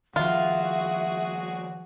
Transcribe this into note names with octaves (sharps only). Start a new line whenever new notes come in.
D#3 F3 F4 F#4 G#4 E5